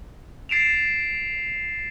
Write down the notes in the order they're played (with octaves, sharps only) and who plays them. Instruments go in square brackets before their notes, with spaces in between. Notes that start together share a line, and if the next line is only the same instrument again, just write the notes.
[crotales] A6 C7 D7 E7 F7